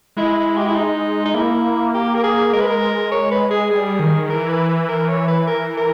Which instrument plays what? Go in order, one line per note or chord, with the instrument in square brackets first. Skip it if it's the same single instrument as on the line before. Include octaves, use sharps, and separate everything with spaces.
[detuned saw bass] G#3 [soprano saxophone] E4
[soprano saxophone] G4
E4
D#4
D#4
[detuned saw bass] A#3 [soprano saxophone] E4
[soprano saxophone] G4
A#4
G#4
[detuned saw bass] G#3 [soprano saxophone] A#4
[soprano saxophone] B4
A#4
C#5
B4
G#4
[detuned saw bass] G3 [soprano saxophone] G#4
[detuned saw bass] D#3
[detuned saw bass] E3 [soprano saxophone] A#4
[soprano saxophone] B4
B4
A#4
C#5
B4
A#4
A#4